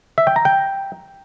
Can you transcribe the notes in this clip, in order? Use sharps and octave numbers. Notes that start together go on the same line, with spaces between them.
E5
G5
A#5
G5